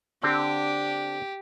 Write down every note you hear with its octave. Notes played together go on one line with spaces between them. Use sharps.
D3 C4 D4 G4